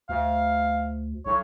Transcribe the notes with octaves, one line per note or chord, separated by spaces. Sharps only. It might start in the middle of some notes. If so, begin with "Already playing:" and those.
D2 F5
B1 C#5